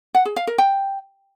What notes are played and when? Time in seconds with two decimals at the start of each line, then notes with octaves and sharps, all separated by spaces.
0.14 F#5
0.25 G#4
0.36 F5
0.47 A#4
0.58 G5